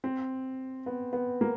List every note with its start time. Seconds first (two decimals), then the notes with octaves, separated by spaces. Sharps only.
0.04 C4
0.86 B3
1.13 B3
1.41 A#3